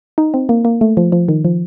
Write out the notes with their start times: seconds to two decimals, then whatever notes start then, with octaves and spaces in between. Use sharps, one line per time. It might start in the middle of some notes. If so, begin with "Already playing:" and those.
0.18 D#4
0.34 C4
0.49 A#3
0.65 A#3
0.81 A3
0.97 F3
1.12 F3
1.28 D#3
1.45 F3